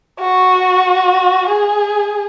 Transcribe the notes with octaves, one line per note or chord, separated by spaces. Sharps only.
F#4
G#4